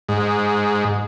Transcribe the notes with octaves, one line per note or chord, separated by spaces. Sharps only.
G#2